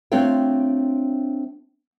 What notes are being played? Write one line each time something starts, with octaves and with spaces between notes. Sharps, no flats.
A3 C4 D4 F4 C#5 G5